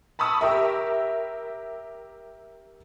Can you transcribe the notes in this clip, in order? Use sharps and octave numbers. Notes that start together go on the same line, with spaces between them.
A5 B5 C#6 D#6 E6
G4 A#4 E5